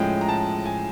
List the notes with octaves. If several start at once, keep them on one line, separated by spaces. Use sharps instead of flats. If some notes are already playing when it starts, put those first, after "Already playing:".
Already playing: A2 F3 G#3 C#4 G5
A#5
A5
G#5